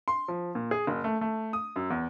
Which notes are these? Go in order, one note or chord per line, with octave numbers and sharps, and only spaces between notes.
C6
F3
A#2
G#4
F#1
A3
A3
D#6
F#2
E2